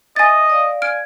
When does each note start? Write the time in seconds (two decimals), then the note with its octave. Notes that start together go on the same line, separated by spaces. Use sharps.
0.16 D#5 E5 G#5 A6
0.50 D5 F5
0.82 G#5 F6 D7